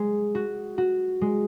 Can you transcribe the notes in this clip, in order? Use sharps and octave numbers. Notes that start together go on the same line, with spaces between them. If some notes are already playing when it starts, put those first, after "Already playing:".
Already playing: G#3
F#4
F#4
G#3